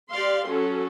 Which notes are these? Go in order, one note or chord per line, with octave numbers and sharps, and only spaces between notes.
G4 D5 F5 C6
F#3 C#4 A4